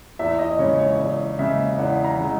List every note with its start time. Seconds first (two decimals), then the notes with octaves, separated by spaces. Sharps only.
0.19 E2 E5
0.39 D#5
0.59 C#3 G#3 C#5
0.79 C#5
0.99 E2
1.38 C#3 G#3 E5
1.79 E2 F#5
2.04 A#5
2.17 C#3 G#3